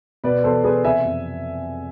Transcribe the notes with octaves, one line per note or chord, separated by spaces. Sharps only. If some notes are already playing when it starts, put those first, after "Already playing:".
B2 B4 D5
E2 A4 C5
E2 G#4 B4
C3 E5 G#5
F2